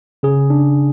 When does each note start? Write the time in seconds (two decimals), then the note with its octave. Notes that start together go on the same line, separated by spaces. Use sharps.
0.23 C#3 G#4
0.50 D4